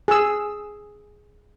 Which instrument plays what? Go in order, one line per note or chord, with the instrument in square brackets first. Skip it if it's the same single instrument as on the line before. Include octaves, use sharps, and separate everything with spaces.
[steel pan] G#4 E6